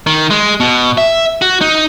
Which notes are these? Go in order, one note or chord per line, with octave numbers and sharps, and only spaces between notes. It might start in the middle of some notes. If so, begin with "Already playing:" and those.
D#3
G#3
B2
E5
F#4
D#4